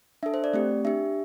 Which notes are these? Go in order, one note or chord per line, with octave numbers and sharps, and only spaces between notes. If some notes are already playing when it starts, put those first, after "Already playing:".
D4 A4 E5
C5
D5
A3 C4 G4
D4 G4 E5